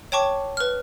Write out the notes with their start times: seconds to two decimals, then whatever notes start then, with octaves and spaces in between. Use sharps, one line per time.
0.12 C#5 G5 A5 C#6 D6
0.57 B4 F6